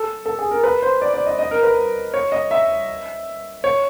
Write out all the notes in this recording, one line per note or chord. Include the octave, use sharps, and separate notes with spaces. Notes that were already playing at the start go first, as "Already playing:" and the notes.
Already playing: A4
A4
G#4
A#4
B4
C5
D5
D5
D#5
D#5
A#4
B4
C#5
D#5
E5
C#5